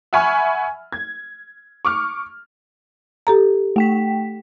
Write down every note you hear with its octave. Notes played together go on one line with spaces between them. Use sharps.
E5 F#5 G#5 B5 C#6 F6
G#6
C#6 D6 F6
G4 A4 A#5
A3 G5 B6